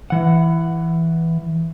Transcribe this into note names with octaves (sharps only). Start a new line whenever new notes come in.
E3 F#5